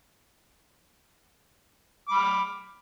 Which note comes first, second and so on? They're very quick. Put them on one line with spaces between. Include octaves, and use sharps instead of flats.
D6 B5 F6